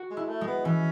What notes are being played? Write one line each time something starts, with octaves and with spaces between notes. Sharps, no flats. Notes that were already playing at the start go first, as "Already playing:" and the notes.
Already playing: F#4
G#3
E4
A3
G#3
B3
E3 C#4